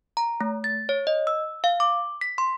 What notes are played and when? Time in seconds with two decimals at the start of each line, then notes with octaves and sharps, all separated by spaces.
0.17 A#5
0.41 A3
0.64 A6
0.89 C#5
1.07 D#5
1.27 E6
1.64 F5
1.80 D6
2.21 B6
2.38 C6